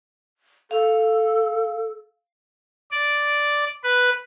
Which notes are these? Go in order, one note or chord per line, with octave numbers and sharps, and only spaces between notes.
A4 F5
D5
B4